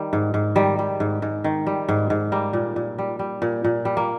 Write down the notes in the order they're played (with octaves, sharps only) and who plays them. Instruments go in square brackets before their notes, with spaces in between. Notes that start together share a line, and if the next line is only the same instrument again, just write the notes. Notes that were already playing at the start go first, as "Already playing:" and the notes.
Already playing: [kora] D#3 G3
G#2
G#2
D#3 G3
G3
G#2
G#2
D#3
G3
G#2
G#2
G3 A#3
A#2
A#2
G3
G3
A#2
A#2
G3
A#3